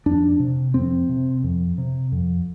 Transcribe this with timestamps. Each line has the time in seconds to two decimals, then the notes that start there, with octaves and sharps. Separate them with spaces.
0.06 F2 D4
0.40 C3
0.74 F2 C4
1.09 C3
1.44 F2
1.78 C3
2.12 F2